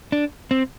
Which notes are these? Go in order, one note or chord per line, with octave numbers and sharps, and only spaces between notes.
D4
C4